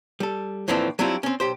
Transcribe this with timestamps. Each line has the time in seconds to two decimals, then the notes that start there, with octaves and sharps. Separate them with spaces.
0.20 G3 A4
0.68 D#2 A2 E3 F3 C4 D4
0.99 F#3 G3 C4 D4 E4 F4
1.23 C4 C#4
1.40 B1 G4 C5